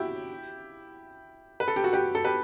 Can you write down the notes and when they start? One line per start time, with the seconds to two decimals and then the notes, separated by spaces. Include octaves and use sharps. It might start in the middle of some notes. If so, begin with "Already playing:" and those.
Already playing: E4 F#4 G4
1.60 B4
1.68 A4
1.76 G4
1.84 F#4 A4
1.93 G4 B4
2.15 A4
2.25 G4 B4